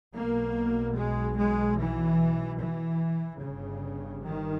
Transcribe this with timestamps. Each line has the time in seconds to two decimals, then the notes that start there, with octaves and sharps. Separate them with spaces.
0.15 B1 B2 A#3
0.97 G#3
1.38 G#3
1.79 E3
2.60 E3
3.40 G1 G2 C#3
4.23 D#3